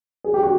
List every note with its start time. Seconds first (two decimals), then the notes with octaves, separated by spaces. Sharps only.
0.24 G#4
0.34 G4
0.43 F#4